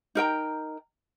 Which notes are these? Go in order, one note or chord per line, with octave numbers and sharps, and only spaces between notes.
D#4 A#4 G5 A#5